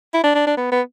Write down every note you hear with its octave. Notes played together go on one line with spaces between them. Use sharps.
E4
D4
D4
D4
B3
B3